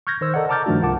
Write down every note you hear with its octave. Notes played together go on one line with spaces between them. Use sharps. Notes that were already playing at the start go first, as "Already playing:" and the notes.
C#6 F6 G6 G#6 A#6
D#3 C5 E6
A4 A#4 D5 D#5 F#5
A5 A#5 D6 F6 G6 A6
G2 D#3 F3 A3 D4 F#4
C2 F4 A#4 F#5 A5 D6